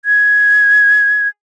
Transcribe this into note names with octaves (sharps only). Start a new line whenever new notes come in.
G#6